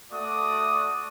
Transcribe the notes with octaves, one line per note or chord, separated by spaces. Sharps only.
A3 F#4 D5 D6 D#6